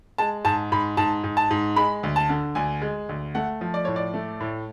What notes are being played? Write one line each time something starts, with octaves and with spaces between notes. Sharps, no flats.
G#3 A5
G#2 A5
G#2 B5
G#2 A5
G#2
A5
G#2
G#3 B5
D2
A5
D3
D2 G#5
G#3
D2
A3 F#5
F3
D5
A2 C#5
D5
A3
A2